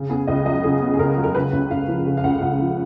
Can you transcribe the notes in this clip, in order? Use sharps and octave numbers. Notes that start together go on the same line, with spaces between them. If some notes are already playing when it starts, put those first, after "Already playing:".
Already playing: C#3
B3 G#4
C#2 D#5
F#3 D#5
C#3 G#4
B3
G#4
C#2 A#4
F#3
A#4
C#3 B4
C#2
C#2 F5
F3
C#3
F5
C#2 F#5
C#2 F5
F3